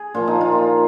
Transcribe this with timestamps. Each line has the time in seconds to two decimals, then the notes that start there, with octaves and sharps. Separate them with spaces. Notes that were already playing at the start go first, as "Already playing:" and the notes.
Already playing: G#4
0.15 A#2 F3 F4
0.27 D#4
0.41 F4